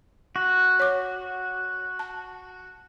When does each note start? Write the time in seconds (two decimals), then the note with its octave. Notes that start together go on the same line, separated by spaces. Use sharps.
0.36 F#4
0.80 C#5 D6
1.99 A5